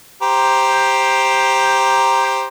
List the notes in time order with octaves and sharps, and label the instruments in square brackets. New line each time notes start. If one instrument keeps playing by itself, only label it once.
[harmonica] G4 C5 A#5